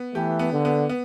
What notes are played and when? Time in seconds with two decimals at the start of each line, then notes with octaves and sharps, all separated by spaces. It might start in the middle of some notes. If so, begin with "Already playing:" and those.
Already playing: B3
0.15 E3 A3 G4
0.39 B3
0.53 D3
0.65 B3
0.89 B3